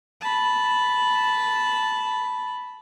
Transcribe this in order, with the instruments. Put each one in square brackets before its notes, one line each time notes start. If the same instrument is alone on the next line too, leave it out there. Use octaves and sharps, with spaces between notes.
[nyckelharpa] A5 B5